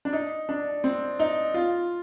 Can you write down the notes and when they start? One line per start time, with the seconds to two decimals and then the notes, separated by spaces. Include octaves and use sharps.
0.05 D4
0.13 D#4
0.49 D4
0.84 C4
1.19 D#4
1.54 F4